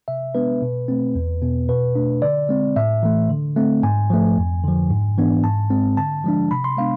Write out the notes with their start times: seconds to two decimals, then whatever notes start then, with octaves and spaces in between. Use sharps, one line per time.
0.08 C3 E5
0.34 G#3 B3 D4 B4
0.62 B2
0.88 A3 C4
1.15 E2
1.42 B2 B3
1.69 B2 B4
1.95 A3 D4
2.22 D3 D5
2.49 G#3 C4
2.76 A2 E5
3.03 E3 A3
3.30 D3
3.56 A3 C4
3.83 G#2 G#5
4.10 F3 A3
4.37 F2
4.64 D3 F3
4.90 G#2
5.17 E3 B3 D4
5.44 G#2 A5
5.70 G#3 C4
5.97 D3 A5
6.24 F3 G#3 D4
6.51 C3 B5
6.64 C6
6.77 G#3 B3 D4 F5